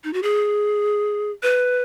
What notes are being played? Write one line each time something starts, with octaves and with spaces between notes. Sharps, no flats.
D#4
F#4
G#4
B4